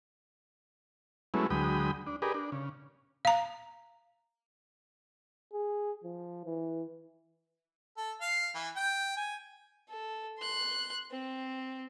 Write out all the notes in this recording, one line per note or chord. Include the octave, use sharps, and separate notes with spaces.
F#3 G#3 A3 B3 C#4 E4
D2 F#3 G#3 G5 B5 D#6
D4
G4 G#4 A#4 B4 D5 D#5
D4
C#3
F5 A#5
G#4
F3
E3
A4
F5
E3
G5
G#5
A4
C6 F#6
C4